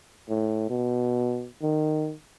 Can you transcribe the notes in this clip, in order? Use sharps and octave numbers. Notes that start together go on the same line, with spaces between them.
A2
B2
D#3